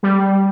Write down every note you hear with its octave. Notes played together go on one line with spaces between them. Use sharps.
G3